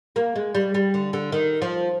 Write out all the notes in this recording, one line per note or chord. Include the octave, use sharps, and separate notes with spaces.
A#3
G#3
G3
G3
D3
D3
D#3
F3